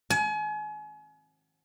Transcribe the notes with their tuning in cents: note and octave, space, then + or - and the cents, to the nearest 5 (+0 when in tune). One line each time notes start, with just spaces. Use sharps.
G#5 +35